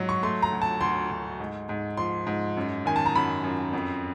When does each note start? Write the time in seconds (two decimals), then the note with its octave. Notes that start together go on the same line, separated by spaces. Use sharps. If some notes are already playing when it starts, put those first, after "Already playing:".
Already playing: G#2 F#3
0.09 C#6
0.23 A3 C6
0.42 A#5
0.52 D2
0.62 A5
0.81 D2 C6
1.11 D2
1.40 G#2
1.69 G#2
1.97 F3 C6
2.27 G#2
2.57 F#2
2.86 D#3 G#5
2.96 A5
3.06 A#5
3.15 F#2 B5
3.43 F#2
3.73 F2